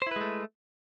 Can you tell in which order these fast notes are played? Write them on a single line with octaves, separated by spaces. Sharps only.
C5 E4 B4 G#3 A3